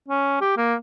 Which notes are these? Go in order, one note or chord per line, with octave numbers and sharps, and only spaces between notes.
C#4
G4
A#3